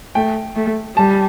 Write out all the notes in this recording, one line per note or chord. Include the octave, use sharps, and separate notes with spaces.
A3 G5
A3
G3 A5